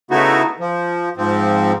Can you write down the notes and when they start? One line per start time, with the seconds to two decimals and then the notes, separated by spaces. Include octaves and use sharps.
0.11 C#3 A3 B3 D#4 E4 F#4
0.60 F3
1.17 G#2 F3 C4